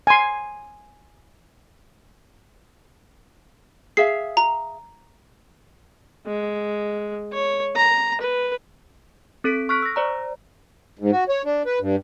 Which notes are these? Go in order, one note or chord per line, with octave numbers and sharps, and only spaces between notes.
G#5 C6
G#4 E5 F5 C7
A#5
G#3
C#5
A#5
B4
C4 A4 B6 D7
C#6 F6 F#6 B6 D7
E6 A#6
C5 D5 A#5
G#2
F#4
C#5
D4
B4
G2